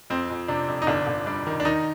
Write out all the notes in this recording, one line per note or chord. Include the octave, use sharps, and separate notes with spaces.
F2 C4
F2
C3 D4
F2
D#4
G1 D4
G1
G3 D4
D#3
D4
D#3 D#4